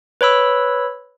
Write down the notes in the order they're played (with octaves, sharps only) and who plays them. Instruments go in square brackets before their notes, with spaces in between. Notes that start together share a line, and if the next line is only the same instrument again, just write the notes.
[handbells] B4 C#5 B5 E6